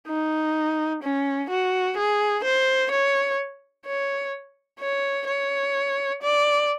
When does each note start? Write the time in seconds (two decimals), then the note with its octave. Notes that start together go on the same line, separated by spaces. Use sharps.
0.08 D#4
1.03 C#4
1.50 F#4
1.97 G#4
2.44 C5
2.91 C#5
3.86 C#5
4.80 C#5
5.27 C#5
6.23 D5